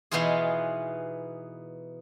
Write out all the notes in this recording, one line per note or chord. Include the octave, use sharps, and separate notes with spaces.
B2 E3 B3 D#4 F4 G#4